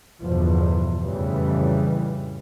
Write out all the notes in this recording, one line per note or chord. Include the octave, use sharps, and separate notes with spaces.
G1 E2 B2 F3
F2 A2 C#3 E3 G3